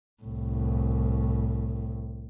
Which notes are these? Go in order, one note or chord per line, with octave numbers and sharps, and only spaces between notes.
C2 A2